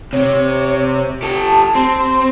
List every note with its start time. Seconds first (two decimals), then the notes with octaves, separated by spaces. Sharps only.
0.13 C3 C4 C#5
1.23 G4 A4 A5
1.75 C4 C6